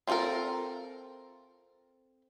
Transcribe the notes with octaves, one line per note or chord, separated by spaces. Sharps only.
C4 F4 F#4 A4 A#4